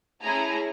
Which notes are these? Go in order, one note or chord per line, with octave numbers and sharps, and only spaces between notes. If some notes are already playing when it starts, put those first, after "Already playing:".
A3 C#4 E4 G#4 A#5